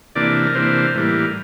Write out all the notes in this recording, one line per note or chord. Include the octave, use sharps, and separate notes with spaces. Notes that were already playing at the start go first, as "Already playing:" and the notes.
C3 E3 A#3 D4 D5
A#4
C3 E3 A#3 D4 C5
A2 E3 G3 A#3